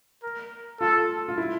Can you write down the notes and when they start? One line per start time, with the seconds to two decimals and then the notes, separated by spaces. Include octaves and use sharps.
0.23 A#4
0.80 F4 A4
1.28 F4
1.38 E4